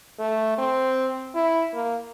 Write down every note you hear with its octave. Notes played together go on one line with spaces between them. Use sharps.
A3
C4
E4
A#3